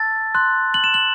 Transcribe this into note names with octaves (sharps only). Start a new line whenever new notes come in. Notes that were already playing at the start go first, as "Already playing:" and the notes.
Already playing: A5 E6 A6
C6 F#6
F#7
E7
F#7